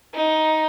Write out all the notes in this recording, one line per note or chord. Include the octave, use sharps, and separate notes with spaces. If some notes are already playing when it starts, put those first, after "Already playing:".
D#4